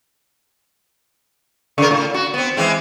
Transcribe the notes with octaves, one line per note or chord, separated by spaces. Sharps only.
C#3 A#4
A2
F#4
B3 C4
E3 G#3 C4